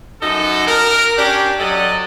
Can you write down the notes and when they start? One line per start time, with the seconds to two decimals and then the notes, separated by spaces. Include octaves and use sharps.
0.22 F#2 D#4 F#4 A4
0.67 A#4
1.18 C#4 D4 G4
1.59 F#3 A4 D5 D#5